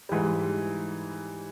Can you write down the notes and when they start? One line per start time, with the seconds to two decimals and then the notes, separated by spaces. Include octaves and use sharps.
0.09 G#2 E3 G3